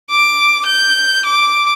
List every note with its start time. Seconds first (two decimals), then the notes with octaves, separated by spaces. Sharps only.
0.10 D6
0.66 G6
1.25 D6